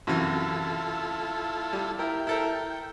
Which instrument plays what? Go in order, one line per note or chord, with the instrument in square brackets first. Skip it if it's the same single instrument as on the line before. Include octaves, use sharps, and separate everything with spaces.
[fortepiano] F#2 C3 E3 [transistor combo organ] E4 F4 A4
[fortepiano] G3
[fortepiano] E4 A#4 [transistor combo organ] G5
[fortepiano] E4 A4 A#4